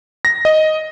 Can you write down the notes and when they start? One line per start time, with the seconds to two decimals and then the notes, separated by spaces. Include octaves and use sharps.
0.25 A#6
0.45 D#5